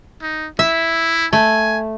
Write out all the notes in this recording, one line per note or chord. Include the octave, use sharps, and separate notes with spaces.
D#4
E4 E5
A3 G#5